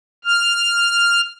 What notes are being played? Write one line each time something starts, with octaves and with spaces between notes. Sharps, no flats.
F6